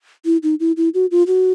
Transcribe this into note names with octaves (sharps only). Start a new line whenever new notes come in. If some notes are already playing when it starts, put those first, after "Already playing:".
E4
D#4
E4
E4
F#4
F4
F#4